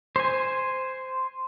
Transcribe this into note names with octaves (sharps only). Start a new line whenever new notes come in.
C5 G#5